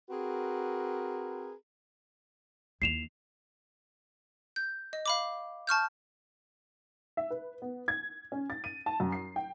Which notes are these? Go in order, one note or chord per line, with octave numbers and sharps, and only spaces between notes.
C4 F#4 G#4 A#4 B4
D#2 E4 C7 E7 F7
G6
D#5
F5 B5 D6
A5 C#6 F6 G6
E5
B4
B3
G#6
C#4
A6
D#7
A5
F#2
C7
G5